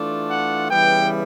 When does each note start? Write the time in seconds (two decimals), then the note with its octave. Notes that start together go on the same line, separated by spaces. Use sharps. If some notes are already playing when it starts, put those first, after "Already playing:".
Already playing: E3 A3 D4 F4
0.29 F#5
0.70 C#3 E3 G3 B3 G5